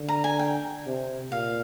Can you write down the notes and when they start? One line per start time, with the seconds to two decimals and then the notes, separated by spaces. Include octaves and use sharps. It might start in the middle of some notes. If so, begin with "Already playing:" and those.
Already playing: D3
0.09 A#5
0.24 G#5
0.39 G5
0.86 C3
1.31 A#2 F5